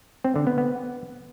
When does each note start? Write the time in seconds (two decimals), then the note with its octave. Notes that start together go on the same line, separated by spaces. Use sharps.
0.24 C4
0.36 D3
0.47 B3
0.58 B3